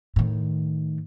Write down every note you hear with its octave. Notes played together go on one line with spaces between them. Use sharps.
A2 D#3